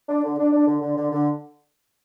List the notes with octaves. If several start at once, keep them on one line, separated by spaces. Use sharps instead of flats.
D4
D3
D4
D4
D3
D3
D3
D3